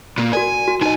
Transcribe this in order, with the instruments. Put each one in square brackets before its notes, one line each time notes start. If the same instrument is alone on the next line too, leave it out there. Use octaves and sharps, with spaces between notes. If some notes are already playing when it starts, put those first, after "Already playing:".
[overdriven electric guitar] A#2 A#3
[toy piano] F#4 A#4 D5 [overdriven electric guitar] G#5
[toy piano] F#4
[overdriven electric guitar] B1 G#5 [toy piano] D#4 D#5